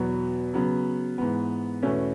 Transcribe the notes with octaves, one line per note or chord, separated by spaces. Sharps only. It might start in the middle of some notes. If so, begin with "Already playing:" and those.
Already playing: E2 B2 F#3 B3
C#3 F#3 B3
G#2 E3 B3
E2 B2 A3 C#4